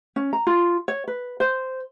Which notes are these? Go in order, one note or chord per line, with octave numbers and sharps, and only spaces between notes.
C#4
A#5
F4
C#5
B4
C5